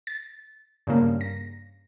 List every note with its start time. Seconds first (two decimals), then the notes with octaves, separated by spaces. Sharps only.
0.07 A6
0.87 G2 C#3 A#3
1.21 A#6